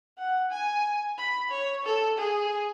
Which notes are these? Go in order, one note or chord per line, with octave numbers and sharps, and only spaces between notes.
F#5
G#5
B5
C#5
A4
G#4